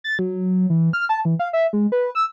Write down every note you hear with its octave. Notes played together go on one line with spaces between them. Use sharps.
A6
F#3
E3
F6
A5
E3
F5
E5
G#3
B4
E6